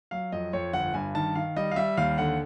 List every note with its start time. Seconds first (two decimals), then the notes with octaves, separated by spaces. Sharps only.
0.11 F#3 F5
0.32 F2 D#5
0.53 F2 C#5
0.73 G1 F#5
0.94 G2 G#5
1.15 D#3 A5
1.35 D#3 F5
1.56 G3 D#5
1.71 F5
1.76 G3 E5
1.97 D#2 F5
2.18 D3 F#5